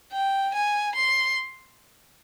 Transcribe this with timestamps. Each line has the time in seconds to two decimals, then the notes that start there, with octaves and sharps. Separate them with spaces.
0.12 G5
0.54 G#5
0.96 C6